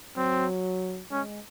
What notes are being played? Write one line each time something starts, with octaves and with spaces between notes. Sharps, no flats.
F#3 C4
G#3 C#4